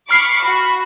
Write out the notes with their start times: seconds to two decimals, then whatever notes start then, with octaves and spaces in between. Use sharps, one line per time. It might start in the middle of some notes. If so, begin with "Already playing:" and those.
0.11 B5 C#6 D6 F6 C7
0.43 F#4 B5